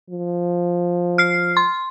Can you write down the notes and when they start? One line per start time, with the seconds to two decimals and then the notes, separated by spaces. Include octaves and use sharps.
0.10 F3
1.18 F6 C7
1.57 C6